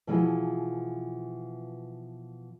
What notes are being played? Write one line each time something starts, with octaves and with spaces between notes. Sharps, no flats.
B2 E3 F3 G#3 E4 F4